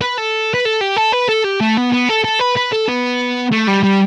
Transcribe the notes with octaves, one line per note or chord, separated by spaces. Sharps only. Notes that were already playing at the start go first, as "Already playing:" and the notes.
B4
A4
B4
A4
G4
A4
B4
A4
G4
A3
B3
B3
A4
A4
B4
B4
A4
B3
A3
G3
G3